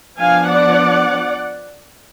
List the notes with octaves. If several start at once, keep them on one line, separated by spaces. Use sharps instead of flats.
F3 B3 D4 F5 G#5
D5 F#5